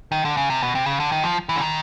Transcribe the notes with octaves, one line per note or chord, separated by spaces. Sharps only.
D#3
D3
C#3
C3
B2
C3
C#3
D3
D#3
F3
E3
D3
D#3